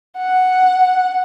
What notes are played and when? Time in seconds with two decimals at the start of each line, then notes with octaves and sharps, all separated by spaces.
0.18 F#5